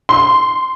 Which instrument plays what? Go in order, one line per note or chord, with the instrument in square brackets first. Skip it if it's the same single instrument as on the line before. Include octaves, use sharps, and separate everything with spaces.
[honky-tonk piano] C6